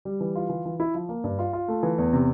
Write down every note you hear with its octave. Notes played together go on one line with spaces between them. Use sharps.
G3
E3
F4
E3
E3
E4
F3
A#3
G2
F4
F4
A3
E3
E2
C3